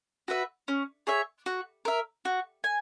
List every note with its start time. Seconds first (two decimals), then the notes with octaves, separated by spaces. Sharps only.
0.28 F#4 B4 E5
0.68 C#4
1.07 G#4 C#5 E5
1.46 F#4
1.85 A#4 E5
2.25 F#4
2.64 G#5